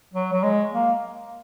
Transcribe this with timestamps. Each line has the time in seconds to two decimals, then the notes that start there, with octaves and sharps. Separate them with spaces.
0.14 F#3
0.33 F#3
0.43 G#3
0.72 A#3